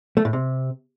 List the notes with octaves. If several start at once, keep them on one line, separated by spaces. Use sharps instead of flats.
A3
A2
C3